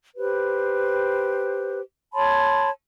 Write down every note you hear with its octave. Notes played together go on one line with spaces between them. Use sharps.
G4 B4 C5
C#5 A5 B5 C6